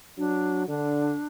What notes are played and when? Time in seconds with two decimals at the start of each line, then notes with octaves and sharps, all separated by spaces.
0.18 F#3 D4
0.68 D3 D4